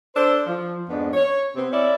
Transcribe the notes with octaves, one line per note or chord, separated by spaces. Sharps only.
D4 A4 C5
F3
F2 G#2 B3 D4
C#5
C3 B3 C4
C#4 E4 D5